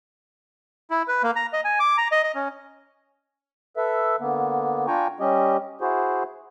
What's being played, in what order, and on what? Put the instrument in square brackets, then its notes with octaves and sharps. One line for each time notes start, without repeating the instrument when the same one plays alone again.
[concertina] E4
B4
A#3
A#5
D#5
G#5
D6
A#5
D#5
D#5
C#4
[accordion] A4 B4 E5
D3 A#3 B3
D4 F4 G5 G#5 A#5 C#6
G3 C#4 G4 D#5
E4 F#4 G#4 C5